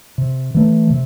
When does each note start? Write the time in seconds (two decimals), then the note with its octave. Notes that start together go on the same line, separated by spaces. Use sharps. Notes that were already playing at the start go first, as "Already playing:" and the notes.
0.18 C3
0.54 E3 A3
0.90 C3